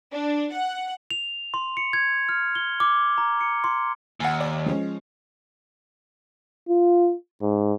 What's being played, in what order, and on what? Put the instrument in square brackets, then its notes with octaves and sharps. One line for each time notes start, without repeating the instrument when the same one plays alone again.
[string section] D4
F#5
[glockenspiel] F7
C6
C#7
G#6
F6
G7
D6
A#5
C#7
C6
[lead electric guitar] D#2 [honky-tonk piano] F#5 G#5
[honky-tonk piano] D5
F3 G#3 C#4
[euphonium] F4
G#2